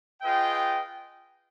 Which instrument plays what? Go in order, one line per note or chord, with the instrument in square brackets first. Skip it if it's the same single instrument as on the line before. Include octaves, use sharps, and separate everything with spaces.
[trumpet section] F4 G#4 B4 D#5 G5